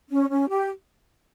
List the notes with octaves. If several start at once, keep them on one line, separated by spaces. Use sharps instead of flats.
C#4
C#4
G4